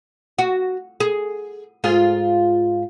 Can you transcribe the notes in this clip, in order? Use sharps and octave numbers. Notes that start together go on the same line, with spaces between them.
F#4
G#4
G#2 F4 G#4